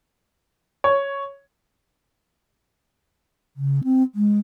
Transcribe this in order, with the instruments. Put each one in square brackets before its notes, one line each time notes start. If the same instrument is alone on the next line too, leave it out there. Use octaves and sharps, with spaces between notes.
[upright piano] C#5
[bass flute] C#3
C4
G#3